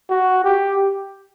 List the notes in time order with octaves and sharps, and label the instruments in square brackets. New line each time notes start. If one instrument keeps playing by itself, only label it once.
[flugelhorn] F#4
G4